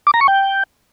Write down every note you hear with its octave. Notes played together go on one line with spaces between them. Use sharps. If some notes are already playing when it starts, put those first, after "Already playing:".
D6
A#5
C#6
G5